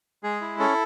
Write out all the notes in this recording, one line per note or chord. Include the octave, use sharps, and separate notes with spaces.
G#3 G#4
E4
C#4 A4